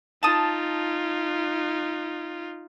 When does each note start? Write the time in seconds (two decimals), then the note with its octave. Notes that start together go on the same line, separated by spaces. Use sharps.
0.23 D#4 F4 A5 D#6